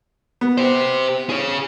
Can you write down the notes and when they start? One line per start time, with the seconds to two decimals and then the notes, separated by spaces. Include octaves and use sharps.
0.41 B3
0.58 G4 C5
1.29 G#4 C#5